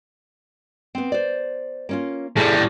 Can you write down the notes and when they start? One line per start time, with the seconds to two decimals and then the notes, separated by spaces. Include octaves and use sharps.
0.95 B3 C4
1.12 C5 D5
1.89 A#3 C#4 F4
2.37 A2 C3 G3 A3 G#4